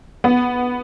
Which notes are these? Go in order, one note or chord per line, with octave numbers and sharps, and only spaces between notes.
B3